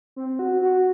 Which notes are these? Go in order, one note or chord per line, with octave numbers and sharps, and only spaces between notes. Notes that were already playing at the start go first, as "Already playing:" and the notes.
C4
F#4
F#4